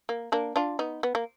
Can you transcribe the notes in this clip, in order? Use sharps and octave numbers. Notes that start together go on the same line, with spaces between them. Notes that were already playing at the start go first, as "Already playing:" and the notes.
A#3
A#3 D4
D4 F4
B3 D#4
B3
A#3